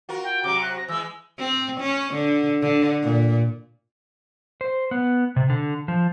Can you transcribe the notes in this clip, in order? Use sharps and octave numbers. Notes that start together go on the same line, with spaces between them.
F4 F#4 A#4
G5
C3 F#3 D6
F#6
A#6
E3 G#3 E6
C4
C#4
D3
D3
A#2
C5
B3
C3
D3
F3